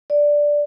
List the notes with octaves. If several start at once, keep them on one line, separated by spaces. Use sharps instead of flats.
D5